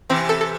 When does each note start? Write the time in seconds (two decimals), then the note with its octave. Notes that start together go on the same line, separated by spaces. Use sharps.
0.10 C3 E3 C4
0.29 A4
0.41 A4